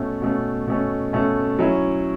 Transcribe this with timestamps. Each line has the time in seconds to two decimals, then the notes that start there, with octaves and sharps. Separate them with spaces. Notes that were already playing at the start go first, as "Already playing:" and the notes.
Already playing: B2 A3 C#4
0.22 B2 A3 C#4
0.67 B2 A3 C#4
1.13 B2 A3 C#4
1.59 F#3 C#4 E4